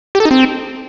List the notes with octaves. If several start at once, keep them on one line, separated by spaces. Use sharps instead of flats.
G4
A4
D#4
C4